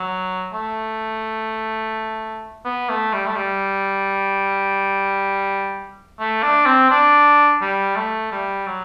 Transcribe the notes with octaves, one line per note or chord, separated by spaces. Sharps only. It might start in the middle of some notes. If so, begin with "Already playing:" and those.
Already playing: F#3
A3
B3
A3
G3
A3
G3
A3
D4
C4
D4
G3
A3
G3
F#3